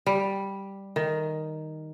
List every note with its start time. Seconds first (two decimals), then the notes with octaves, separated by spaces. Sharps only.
0.06 G3
0.96 D#3